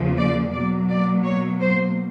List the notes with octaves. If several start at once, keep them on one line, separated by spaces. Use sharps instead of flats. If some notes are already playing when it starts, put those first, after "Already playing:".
Already playing: E2 C#3 F3 A#3
D5
B2 F#3 A#3 D5
D5
C#5
C5